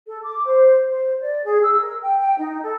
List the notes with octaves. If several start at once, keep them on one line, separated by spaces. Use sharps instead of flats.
A4
D6
C5
C5
D5
G#4
E6
A#4
G5
G5
D#4
A4